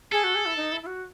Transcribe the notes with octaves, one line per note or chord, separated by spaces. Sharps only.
G#4 A4
F#4
G#4
E4
D#4
E4
E4
F#4